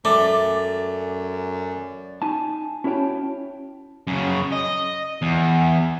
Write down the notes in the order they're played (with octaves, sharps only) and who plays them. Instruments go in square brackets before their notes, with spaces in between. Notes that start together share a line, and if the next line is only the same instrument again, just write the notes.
[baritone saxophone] F#2 [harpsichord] A3 [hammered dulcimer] D5
[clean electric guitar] D#4 G#5 A5
C#4 E4 F#4 C#5 G5 A5
[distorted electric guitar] F#2 C#3
D#5
E2